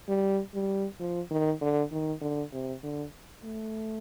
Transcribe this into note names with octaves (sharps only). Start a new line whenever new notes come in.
G3
G3
F3
D#3
D3
D#3
D3
C3
D3
A3